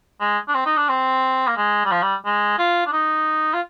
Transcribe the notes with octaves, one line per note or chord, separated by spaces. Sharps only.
G#3
D4
C4
D#4
D4
C4
A#3
G#3
G3
F3
G3
G#3
F4
D4
D#4
F4